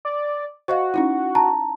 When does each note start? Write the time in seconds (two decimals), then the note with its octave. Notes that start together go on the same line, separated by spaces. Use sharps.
0.05 D5
0.68 F#4 C5 D#5 F5
0.94 C#4 D#4 E4
1.35 A5 A#5